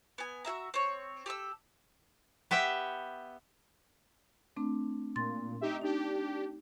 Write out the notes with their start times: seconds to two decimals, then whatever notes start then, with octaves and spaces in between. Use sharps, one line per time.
0.18 B3 G#5
0.45 F#4 G#4 E5 A#5
0.74 C4 C#5
1.26 G4 A4 D6 E6
2.51 B3 G4 E5 G5
4.57 A3 C4 D4
5.16 A#2 C6 A6
5.61 D#4 G4 E5
5.82 D4 D#4 G4